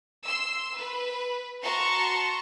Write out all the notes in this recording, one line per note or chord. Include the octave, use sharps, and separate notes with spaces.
C6 E6
B4
F#4 A5 A#5 C6 C#6